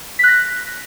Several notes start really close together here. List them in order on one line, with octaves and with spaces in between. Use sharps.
B6 F#6 A#6